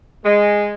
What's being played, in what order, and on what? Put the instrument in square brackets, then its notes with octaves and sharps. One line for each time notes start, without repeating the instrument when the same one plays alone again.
[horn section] G#3